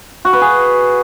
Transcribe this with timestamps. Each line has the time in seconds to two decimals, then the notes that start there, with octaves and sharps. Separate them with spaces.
0.25 F#4
0.33 B4
0.41 G#4